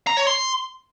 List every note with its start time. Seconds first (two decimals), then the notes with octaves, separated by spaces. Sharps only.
0.07 A#5
0.17 C#5
0.27 C6